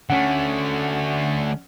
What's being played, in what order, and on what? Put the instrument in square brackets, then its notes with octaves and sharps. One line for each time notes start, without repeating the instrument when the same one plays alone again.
[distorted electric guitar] D3 A3 [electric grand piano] C#4 F#5